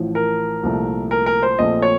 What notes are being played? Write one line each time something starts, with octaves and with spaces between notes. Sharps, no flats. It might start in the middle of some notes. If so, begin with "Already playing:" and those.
Already playing: A1 A2 F3
A#4
C2 A#2 F3 A3
A#4
A#4
C5
A#1 A#2 A3 C4 D#5
C#5